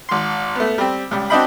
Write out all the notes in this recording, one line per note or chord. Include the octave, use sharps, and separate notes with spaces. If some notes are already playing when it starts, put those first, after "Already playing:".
G#1 C6
A3 B3
G3 C4
C#2 G3
C4 D4 F#4 D#5 G5 B5